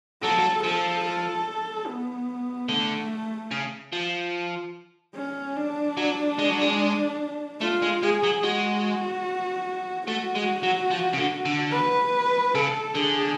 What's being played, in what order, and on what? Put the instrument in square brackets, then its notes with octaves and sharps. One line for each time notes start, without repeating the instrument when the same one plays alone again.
[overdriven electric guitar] F#3 [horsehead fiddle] A4
[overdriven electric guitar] F3
F#3
[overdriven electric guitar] F3 [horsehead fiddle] A4
[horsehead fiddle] A4
B3
[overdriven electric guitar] D3 [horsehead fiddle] A3
[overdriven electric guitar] C#3
F3
[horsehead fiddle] C#4
D4
[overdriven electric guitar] F#3
G#3
F#3
G#3
[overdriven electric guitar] A3 [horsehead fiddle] F4
[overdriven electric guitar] G#3
[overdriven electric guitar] G#3 [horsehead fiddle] G#4
[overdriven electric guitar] F#3
[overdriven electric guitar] G#3 [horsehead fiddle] F#4
[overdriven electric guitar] A3 [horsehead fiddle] F#4
[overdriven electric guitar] G#3
F#3
F3
C#3
D3
D3
[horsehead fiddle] B4
[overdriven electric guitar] C#3 [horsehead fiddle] A4
[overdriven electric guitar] D3 [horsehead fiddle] G#4